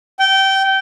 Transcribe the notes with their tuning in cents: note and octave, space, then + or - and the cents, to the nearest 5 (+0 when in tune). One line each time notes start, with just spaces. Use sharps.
G5 -20